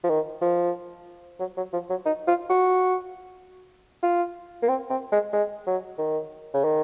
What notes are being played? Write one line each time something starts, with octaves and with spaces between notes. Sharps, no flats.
F3
D#3
F3
F#3
F#3
F3
F#3
D#4
F4
F#4
F4
A#3
C4
C4
G#3
G#3
F#3
D#3
C#3
D#3